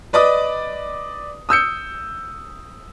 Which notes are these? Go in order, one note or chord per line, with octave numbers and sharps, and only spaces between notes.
B4 D5 D#5 D6 D#6
D#6 E6 G6 C#7